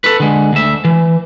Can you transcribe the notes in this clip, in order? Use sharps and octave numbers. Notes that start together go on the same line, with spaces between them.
A4 B4
D3 G#3
D2 E5
E3